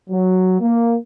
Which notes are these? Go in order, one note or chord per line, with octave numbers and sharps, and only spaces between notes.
F#3
A#3